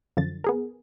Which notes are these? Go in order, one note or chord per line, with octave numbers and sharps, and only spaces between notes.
F#2 D3 F3 A6
B3 G#4 A#4